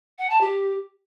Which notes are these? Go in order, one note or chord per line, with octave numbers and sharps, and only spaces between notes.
F#5
A5
G4